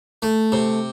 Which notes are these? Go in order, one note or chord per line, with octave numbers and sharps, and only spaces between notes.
A3
C3